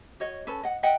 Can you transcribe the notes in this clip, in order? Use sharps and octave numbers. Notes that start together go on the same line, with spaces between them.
F#4 C#5 D#5
C#4 A4 B4
D#5 F#5
D#5 E5 F#5 G5